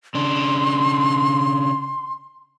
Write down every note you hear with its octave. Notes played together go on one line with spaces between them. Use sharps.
C#3 D4 C6